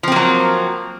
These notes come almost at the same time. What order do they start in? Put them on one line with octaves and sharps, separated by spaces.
F3 C4 A#3 F#3